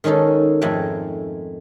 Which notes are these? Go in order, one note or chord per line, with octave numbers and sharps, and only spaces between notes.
D#3 G#3 C#4 D#4 A4
F2 G#2 G#3 A3 G5